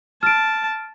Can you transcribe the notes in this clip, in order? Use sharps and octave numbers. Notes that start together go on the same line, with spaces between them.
A5 F6 D7